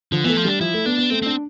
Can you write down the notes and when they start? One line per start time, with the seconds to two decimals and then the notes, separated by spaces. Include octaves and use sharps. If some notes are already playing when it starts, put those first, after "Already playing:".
0.12 D3 F3
0.24 E3 B3
0.29 A3
0.37 F3
0.45 G3 D4
0.61 F3 E4
0.74 A3
0.85 B3 D4
0.98 B3
1.10 A3 C4
1.22 C4 D4